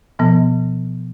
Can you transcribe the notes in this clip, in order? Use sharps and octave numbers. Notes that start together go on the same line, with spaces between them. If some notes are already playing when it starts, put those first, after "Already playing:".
B2 F3 B3